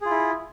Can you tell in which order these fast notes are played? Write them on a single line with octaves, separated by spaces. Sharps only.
G#4 F4 E4